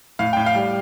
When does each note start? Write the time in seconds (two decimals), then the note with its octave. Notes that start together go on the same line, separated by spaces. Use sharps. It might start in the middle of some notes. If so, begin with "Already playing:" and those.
0.19 A2 F5
0.33 A2 G5
0.46 F5
0.55 G3